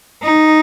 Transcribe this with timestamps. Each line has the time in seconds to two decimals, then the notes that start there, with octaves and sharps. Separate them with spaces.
0.23 D#4